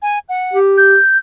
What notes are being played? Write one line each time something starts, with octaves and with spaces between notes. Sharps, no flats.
G#5
F#5
G4
G6